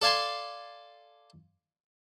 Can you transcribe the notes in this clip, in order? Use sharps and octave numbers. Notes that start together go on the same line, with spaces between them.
A4 D5 F5 G#5 A5 C6